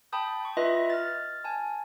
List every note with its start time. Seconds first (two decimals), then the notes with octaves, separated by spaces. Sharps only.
0.12 G5 A5 B5 D#6 G6
0.45 C#6
0.57 F4 B4 D#5 E5 A#6
0.90 F6 A6
1.44 G#5 A5